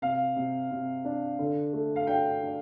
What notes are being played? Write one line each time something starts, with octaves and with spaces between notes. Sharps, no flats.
C3 F5
C3
C3
D4
D3
A3
F5
D4 G5
D4